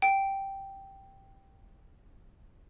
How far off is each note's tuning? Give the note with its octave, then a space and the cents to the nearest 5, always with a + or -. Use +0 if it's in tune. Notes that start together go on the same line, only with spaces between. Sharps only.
G5 -5